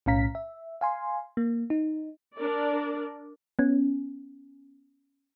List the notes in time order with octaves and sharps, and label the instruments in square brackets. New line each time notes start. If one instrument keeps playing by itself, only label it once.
[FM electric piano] B1 A2 C#4 F5 A#5 B6
E5
F5 G#5 C6
A#3
D#4
[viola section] D4 A#4 D5
[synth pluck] B3 C#4